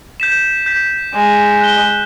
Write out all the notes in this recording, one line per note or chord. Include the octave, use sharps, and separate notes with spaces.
G6 B6 E7
G6 B6
G#3
F#6 G7